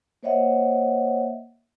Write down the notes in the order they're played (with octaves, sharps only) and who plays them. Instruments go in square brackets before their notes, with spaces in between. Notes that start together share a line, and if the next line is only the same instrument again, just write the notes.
[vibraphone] A#3 C5 C#5 D#5 E5 F#5